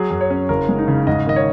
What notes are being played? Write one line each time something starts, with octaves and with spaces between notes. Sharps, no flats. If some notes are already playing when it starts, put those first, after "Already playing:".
Already playing: F#3 G#4
F#2
C#5
C#4
F#1 A#4
G#3
D#4
C#3
G#2 D#5
D#3 D#5
C#5